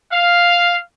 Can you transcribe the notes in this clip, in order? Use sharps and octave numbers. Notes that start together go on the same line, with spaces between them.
F5